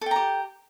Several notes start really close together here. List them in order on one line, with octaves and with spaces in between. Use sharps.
A4 G5 A#5 G4